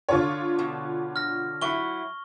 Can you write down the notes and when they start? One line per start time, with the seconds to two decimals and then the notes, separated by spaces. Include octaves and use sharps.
0.09 D3 F4 C#5
0.59 B2
1.16 F6 A#6
1.61 F#3 E4 C#6 G7